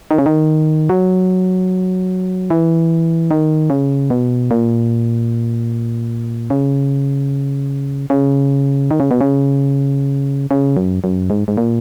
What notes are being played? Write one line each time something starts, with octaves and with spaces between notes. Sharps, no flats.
D#3
C#3
D#3
F#3
E3
D#3
C#3
B2
A#2
C#3
C#3
D#3
C#3
B2
C#3
C#3
F#2
F#2
G#2
G#2
A#2